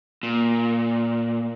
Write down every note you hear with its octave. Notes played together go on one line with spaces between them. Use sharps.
A#2